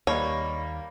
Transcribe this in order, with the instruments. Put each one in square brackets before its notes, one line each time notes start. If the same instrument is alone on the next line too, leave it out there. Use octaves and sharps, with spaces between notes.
[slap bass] D#2 [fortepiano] G3 A#3 [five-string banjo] C#5 [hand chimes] D#5 B5 C#6